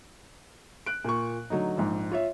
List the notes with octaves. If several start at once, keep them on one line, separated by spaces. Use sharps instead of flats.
F#6 D7
A#2 C#6
D3 F#3 A3 D#4
A#1 G#2
F4 C#5 E5